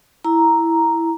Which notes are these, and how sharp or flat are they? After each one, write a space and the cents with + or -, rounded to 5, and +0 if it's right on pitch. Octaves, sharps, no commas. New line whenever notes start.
E4 +0 A#5 +0